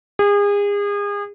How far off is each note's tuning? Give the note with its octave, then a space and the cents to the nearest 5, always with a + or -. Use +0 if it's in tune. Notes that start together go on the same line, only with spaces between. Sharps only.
G#4 -35